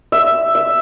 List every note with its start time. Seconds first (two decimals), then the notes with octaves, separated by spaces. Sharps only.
0.12 E5
0.55 E5